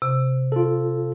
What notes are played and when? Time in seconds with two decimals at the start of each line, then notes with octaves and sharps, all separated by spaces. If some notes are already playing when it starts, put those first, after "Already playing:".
0.02 C3
0.52 F4 A4